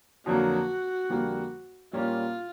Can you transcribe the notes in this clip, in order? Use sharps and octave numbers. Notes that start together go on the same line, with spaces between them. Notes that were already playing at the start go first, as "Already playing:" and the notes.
F2 D3 F#3 A#3 F#4
F2 D3 G3 A#3
A#2 G3 A#3 C#4 F4